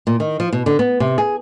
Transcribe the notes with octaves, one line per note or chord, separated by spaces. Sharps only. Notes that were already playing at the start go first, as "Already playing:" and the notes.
A#2
D#3
F3
B2
D3
B3
C3
G#4